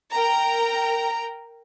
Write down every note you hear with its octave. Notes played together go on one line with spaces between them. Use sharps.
A#4 G5 A#5